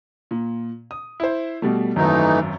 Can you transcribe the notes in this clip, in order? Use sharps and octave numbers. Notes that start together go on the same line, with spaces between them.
A#2
D#6
E4 C5
B2 G3 A3
G#1 F#2 E3 A3 D#4